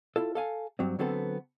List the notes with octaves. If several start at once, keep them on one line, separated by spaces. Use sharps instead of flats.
E4 F4 A4
A4 F5 G#5
G2 F#3 C4
D3 F#3 B3 C4 A4